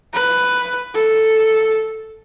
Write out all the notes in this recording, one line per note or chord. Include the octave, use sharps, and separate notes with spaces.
B4
A4